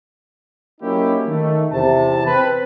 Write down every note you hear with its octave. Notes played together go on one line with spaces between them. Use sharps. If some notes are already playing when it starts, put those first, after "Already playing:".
F#3 A#3 C#4 D#4 E4 G4
D#3 A3
E2 C3 A5
C4 B4